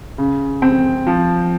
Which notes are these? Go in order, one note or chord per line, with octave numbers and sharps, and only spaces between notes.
C#3
C4
F3